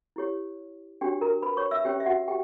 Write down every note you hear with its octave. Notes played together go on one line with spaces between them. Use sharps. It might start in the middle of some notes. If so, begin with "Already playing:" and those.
E4 G4 C#5
D4 F#4 G4 C#5 G5
A#4 A#5
B4 B5
C#5 C#6
E5 E6
C#4 G4 C#5 G5
E5
F#4 F#5
G4 G5